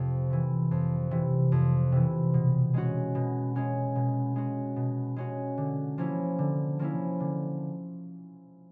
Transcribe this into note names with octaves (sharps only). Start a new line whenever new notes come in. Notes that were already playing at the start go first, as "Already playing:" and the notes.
Already playing: F2 C3
C3 E3
F2
C3 E3
F2
C3 E3
B2
G#3 C#4 F#4
B2
G#3 C#4 F#4
B2
G#3 C#4 F#4
B2
G#3 C#4 F#4
D3
F3 A#3 C#4 E4
D3
F3 A#3 C#4 E4
D3